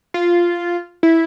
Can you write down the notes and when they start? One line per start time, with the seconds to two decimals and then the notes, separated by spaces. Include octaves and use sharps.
0.14 F4
1.03 E4